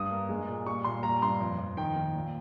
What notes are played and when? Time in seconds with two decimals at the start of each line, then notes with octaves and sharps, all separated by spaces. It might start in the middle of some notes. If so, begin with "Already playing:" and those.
Already playing: G2 D#6
0.11 A#3
0.29 G#3
0.48 A#2
0.66 G3 C#6
0.84 A#2 C6
1.03 G3 A#5
1.22 G2 C6
1.40 F2
1.58 F2
1.77 D#3 G5
1.96 D#3
2.15 A#2